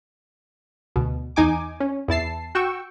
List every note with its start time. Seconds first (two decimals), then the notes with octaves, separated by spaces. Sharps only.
0.96 D2 B2
1.36 E2 D#4 G#5 D6
1.80 C#4
2.08 E2 E4 A5 C7
2.55 F#4 G5 C#6 E6